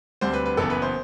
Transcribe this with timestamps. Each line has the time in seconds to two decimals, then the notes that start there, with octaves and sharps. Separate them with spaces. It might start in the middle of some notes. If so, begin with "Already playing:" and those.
0.21 D2 D3 G3 C4 C5
0.33 B4
0.46 B4
0.57 F#1 F#2 E3 B3 A4
0.70 B4
0.82 C5